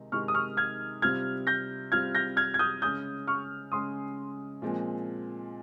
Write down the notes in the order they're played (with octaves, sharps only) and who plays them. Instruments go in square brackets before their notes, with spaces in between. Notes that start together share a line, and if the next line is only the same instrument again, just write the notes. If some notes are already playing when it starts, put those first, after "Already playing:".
Already playing: [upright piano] C3 D#3 G#3 D#4
[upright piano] C3 D#3 G#3 D#4 [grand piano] C#6 F6
[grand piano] D#6
C#6 F6
F6 G#6
[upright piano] C3 G3 C4 F4 [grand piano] F6 G#6
[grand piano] G6 A#6
[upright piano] C3 G3 C4 F4 [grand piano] F6 G#6
[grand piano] G6 A#6
F6 G#6
G#6
D#6 G6
[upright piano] C#3 G#3 C#4 [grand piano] D#6 G6
[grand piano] C#6 F6
[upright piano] C#3 G#3 C#4 [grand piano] C6 D#6
[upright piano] A#2 F3 G#3 C4